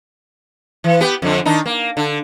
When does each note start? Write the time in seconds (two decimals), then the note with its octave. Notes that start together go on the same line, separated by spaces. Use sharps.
0.84 E3
1.01 B3 G4
1.22 F2 D3
1.46 D#3 D4 D#4
1.66 A#3
1.97 D3